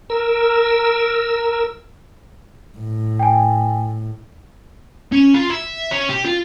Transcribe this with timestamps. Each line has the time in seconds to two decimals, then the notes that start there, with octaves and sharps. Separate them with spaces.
0.10 A#4 E6
2.78 A2
3.19 G5 G#5
5.12 C#4
5.34 F4
5.50 E5
5.91 C#4
6.09 G4
6.26 F4